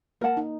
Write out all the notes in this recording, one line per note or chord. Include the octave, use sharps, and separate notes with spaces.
A#3 A#4 F#5 A5
D#4